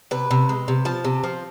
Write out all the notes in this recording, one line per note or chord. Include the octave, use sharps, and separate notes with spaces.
C3 B4
C3
G#3
C3
F3 A5
C3
F3